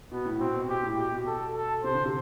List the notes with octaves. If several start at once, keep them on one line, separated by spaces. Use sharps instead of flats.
B2 B3
A2
B2 C4
B2
B2 G4
A2
B2 G4
B2
A4
A4
C3 C5
D3
C3